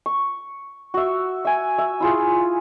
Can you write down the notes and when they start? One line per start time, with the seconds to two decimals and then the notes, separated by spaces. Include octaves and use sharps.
0.06 C#6
0.94 F#4 E5
1.45 E5 G#5
1.78 E5
2.00 E4 F4 G#4